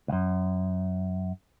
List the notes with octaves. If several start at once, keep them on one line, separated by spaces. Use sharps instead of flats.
C#2 F#2